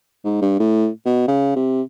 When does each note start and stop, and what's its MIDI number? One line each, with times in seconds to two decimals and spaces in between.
0.24 0.37 44
0.41 0.55 43
0.59 0.88 45
1.05 1.26 47
1.28 1.53 49
1.56 1.82 48